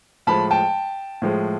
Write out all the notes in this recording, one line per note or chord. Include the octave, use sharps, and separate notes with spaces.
A2 F3 G#3 A5 B5
G5 A5
A2 F3 G#3